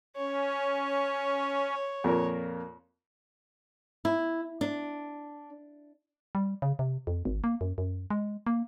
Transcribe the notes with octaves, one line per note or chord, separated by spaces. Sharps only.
C#4 C#5
F2 A#2 A#4
E4
D4
G3
C#3
C3
F2
G#1
A#3
F#2
F#2
G#3
A#3